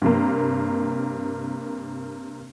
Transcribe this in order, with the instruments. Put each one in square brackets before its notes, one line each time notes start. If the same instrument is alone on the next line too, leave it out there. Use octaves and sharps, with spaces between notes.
[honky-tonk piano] G2 C3 A#3